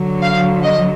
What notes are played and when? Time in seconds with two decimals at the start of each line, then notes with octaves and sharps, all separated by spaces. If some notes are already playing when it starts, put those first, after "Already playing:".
Already playing: D3 F#3
0.21 F5
0.63 D#5